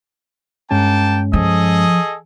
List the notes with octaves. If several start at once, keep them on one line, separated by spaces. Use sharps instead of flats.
G2 G#3 A#3 C#4 G5 A5
F3 G#4 A4 D#5